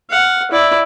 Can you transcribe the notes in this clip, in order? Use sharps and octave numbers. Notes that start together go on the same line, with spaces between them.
F5 F#5
E4 D5